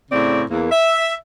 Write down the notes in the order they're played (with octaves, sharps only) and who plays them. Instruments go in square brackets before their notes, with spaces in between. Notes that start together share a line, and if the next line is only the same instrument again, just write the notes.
[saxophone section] A2 C#3 C4 D5
E2 A#3
E5